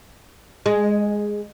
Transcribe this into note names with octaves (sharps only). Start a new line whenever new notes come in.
G#3